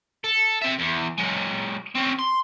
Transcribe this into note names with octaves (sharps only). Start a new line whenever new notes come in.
A4
C3 E5
E2
F#3 G#3
C4 C#4
C6